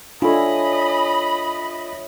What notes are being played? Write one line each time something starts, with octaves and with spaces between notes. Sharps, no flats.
D4 E4 F4 A4 C#5 D#5 G#5 B5